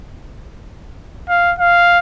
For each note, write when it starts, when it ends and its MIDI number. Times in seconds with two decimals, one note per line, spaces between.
1.29 1.54 77
1.59 1.99 77